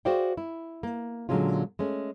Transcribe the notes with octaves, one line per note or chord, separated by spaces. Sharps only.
F#4 G#4 C5 D5 F5 G5
E4
A#3
A#2 D3 F#3 G#3 C#4 F4
G#3 A3 C#4